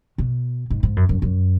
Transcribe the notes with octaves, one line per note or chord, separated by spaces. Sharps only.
B2
G#2
G#2
F#2
F#2
F#2